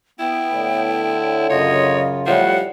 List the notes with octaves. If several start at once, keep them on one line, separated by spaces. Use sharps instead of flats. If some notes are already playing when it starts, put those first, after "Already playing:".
B3 E4 G5
A2 D3
F#2 C#3 F4 C#5 D#5
A2 F3 G3 F#5